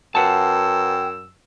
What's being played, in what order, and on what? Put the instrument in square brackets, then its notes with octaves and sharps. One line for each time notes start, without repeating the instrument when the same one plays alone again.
[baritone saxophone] F#2 [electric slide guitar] B4 F#5 A5 [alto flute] G5 [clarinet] E6